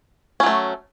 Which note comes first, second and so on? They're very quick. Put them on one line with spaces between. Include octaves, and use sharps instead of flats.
C#4 F#3 A3